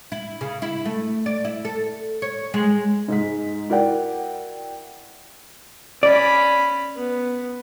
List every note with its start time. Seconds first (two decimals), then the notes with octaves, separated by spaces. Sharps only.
0.12 E4
0.41 C#3
0.62 E4
0.85 A3
1.26 D5
1.45 E4
1.65 A4
2.22 C#5
2.54 G#3
3.08 G#2 G#3 B6
3.69 E4 F#4 A#4 D5 F#5 G5
6.03 C#4 D5 B5
6.96 B3